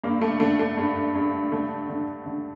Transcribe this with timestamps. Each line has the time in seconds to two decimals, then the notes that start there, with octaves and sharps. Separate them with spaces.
0.04 G2 A#3
0.21 A3
0.40 D3 A3
0.59 A3
0.77 G2
1.15 G2
1.52 D3 A3
1.89 D3
2.26 D3